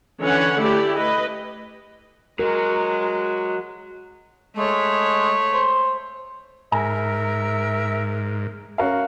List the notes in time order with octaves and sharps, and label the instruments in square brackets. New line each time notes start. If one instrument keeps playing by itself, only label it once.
[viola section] D3 E3 C#4 C#5 F#5
A3 E4 G4 D5
B4 D#5
[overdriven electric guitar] F#3 [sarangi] G#3 [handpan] A#4
[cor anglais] G#3 [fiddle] A3 C#5
[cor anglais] C5
[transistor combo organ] G#2 [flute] A#4 [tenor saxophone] E5 [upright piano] G#5 A#5
[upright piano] C#4 A#4 F5 [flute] F#4